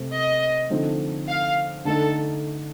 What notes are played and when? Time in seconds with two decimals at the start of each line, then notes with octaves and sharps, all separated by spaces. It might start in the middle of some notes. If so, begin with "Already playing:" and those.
Already playing: C3 A3 C4
0.12 D#5
0.70 D3 F3 A3 C4 D#4
1.28 F5
1.85 D3 A3 D#4 A4